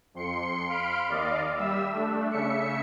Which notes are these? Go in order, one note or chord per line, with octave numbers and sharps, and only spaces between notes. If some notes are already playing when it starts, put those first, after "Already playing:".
F2 C6 C#7
F5 B5 C6 F6 D7
D#2 D5 D#5 F5
G3 E5 E6
A3 D4
C#3 E5 C#7